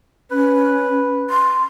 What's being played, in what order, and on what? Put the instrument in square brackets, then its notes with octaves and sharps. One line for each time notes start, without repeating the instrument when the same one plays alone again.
[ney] C#4 [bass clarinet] B4
[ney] C6